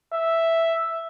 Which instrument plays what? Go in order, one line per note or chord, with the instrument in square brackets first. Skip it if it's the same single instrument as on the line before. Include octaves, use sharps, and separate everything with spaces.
[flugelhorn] E5